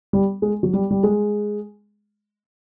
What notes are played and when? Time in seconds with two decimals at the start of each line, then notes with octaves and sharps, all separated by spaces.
0.13 G3
0.42 G#3
0.63 F#3
0.73 G3
0.91 G3
1.03 G#3